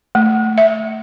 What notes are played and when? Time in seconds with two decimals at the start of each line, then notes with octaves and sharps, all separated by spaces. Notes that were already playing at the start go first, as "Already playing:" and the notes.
0.15 A3
0.58 E5